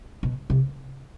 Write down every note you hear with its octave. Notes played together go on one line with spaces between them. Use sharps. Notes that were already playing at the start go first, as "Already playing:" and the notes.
B2
C3